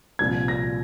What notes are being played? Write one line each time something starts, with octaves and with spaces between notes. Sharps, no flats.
C2 A#2 F3 G#6
A#6